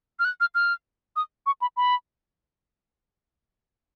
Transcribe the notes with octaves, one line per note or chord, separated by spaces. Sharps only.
F6
F#6
F6
F6
D#6
C#6
B5
B5